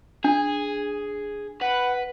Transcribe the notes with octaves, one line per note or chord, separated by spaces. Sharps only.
D4 G#4
B4 F#5